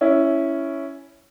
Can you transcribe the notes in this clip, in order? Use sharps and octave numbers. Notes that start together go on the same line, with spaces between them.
C#4 E4